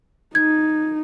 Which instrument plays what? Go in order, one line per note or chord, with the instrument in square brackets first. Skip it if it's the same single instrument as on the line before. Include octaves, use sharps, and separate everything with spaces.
[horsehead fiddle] D#4 [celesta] G#6